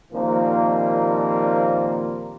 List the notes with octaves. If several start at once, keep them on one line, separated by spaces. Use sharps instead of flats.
A#2 D#3 F3 G3 A#3 C4